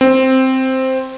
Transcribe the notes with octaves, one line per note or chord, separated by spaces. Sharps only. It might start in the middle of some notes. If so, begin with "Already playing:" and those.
C4